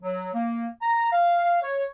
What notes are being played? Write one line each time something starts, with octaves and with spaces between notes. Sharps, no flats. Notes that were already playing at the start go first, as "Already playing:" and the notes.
F#3
A#3
A#5
F5
C#5